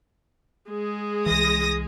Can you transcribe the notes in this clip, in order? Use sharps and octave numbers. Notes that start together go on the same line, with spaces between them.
G#3 G#4
C2 E3 D#6 A#6